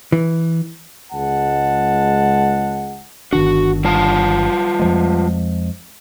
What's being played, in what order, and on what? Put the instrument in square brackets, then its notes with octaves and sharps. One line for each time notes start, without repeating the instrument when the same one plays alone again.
[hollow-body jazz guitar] E3
[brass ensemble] C#2 G#3 F#5 A5
[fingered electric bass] G1 D#3 D4 [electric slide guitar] F#4
[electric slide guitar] G3 F4 A5
[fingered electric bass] F2 F3 G#3